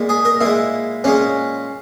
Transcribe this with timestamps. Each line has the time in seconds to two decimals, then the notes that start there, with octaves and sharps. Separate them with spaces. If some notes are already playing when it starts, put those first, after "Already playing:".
Already playing: A#2 G#3
0.09 G#4
0.25 A#4
0.40 A#2 G#3 E4
1.04 A#2 G#3 C#4